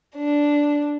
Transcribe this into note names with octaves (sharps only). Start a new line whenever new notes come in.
D4